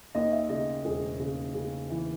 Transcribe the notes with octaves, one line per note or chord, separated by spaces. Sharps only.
D#2 D#5
E5
C#3 D#5
E1 G#4
C#3
C#3
E3